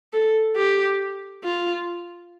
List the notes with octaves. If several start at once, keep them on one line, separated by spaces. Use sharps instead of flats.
A4
G4
F4